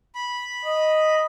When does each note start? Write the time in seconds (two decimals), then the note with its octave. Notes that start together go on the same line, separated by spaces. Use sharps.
0.15 B5
0.65 D#5